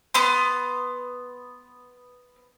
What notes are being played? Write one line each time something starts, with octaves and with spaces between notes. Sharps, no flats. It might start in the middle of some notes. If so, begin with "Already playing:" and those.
B3 C6